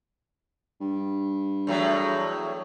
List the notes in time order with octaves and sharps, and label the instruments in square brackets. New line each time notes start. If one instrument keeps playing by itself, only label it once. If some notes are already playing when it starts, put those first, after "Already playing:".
[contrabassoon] G2
[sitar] E2 A2 F#3